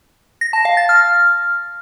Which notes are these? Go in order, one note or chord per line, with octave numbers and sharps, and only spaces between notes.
A#6
A5
F5
A6
F6